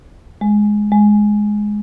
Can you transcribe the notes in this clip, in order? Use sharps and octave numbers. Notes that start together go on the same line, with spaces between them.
G#3
G#3